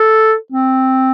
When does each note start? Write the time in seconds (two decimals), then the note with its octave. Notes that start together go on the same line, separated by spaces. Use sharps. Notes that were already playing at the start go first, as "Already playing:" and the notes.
Already playing: A4
0.52 C4